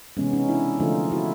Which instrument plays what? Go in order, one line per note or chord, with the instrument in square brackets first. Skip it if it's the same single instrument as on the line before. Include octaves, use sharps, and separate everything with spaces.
[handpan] C3 E3 G#3 B3 C#4
C#4 D#4
D4 E4
D3 F3 A3 D#4 F4
E4 F#4